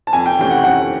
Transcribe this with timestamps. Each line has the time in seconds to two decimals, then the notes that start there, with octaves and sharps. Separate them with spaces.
0.07 A5
0.13 F2 G#5
0.26 G5
0.39 C3 E3 A3 C#4 G5
0.50 F#5
0.64 F2 F#5